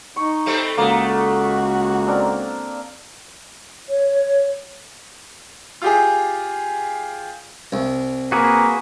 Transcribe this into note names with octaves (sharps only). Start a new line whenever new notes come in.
D#4 C#6
G3 A3 C4
C#2 A3 A#3 F#4 D#5
C4 D4 A#4
C#5
F4 G4 G#4
C2
A#3 F#4 G#4 B4